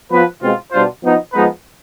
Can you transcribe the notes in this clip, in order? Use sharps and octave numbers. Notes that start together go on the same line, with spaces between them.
F3 B3 F4 B4
B2 G#3 C4 F4
B2 G3 D4 F4 C5
F3 B3 D#4
F3 G#3 B3 D#4 B4